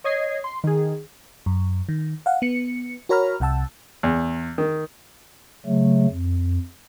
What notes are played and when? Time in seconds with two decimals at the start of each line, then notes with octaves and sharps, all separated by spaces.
0.04 C#5 D#5 G#6 C7
0.44 C6
0.64 D#3 G#4
1.46 F#2
1.89 D#3
2.26 F5 F#5
2.42 B3 C#7
3.09 F#4 A#4 C#5 A#5 B5 F6
3.40 C2 C3 F#5 A5 E6
4.03 E2
4.58 D#3
5.66 C#3 F#3 A3
6.10 F2